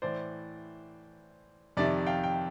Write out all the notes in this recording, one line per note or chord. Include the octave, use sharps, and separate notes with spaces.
A2 E3 C5 D5
F2 C3 D#3 D5 E5
F5 G5
G5